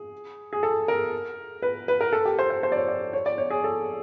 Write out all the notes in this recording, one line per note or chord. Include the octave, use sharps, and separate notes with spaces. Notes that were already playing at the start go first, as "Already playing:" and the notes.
Already playing: G#4
G#4
A4
A#4
B4
B4
A#4
A4
G4
C5
C5
C5
D5
C#5
D5
C#5
D5
C#5
G#4
A4